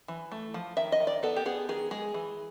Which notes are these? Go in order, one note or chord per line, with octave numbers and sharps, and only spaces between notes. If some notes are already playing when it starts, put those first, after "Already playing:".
E3
A3
F3
D#3 E5
D#5
D#3
D5
B3 A4
G4
B3 G#4
D#3 G#4
G#3 G#4
E3